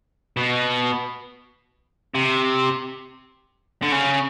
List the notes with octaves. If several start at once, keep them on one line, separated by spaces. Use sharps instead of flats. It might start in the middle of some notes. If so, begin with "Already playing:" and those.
B2
C3
D3
C#3